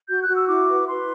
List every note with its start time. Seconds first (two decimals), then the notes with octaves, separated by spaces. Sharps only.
0.09 F#4 G6
0.22 F#6
0.28 F#4
0.35 E6
0.48 E4 D6
0.69 B4
0.88 B4 C6